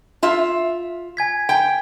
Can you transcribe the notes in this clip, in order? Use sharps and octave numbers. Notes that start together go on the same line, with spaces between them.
F4 E5
G#5 G#6 B6
G5